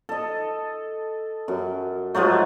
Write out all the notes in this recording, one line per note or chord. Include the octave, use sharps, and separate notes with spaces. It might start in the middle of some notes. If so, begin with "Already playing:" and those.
A4 D#5
F#2
G#2 F3 F#3 A3